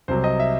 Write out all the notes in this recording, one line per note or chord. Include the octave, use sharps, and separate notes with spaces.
C2 C3 F#3 C5
D#5
E5